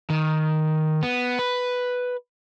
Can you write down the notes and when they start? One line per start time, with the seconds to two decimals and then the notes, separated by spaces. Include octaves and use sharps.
0.10 D#3
1.03 B3
1.39 B4